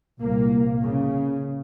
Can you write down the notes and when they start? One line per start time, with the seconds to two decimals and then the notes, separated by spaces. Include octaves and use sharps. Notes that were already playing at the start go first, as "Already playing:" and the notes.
0.20 C2 A#2 A#3
0.83 C#3